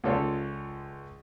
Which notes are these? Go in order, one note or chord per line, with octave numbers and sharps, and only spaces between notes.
C#2 F4 A4 C#5 D5